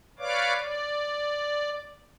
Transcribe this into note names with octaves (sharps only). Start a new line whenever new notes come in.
B4 C#5 D5 F5 D6
D5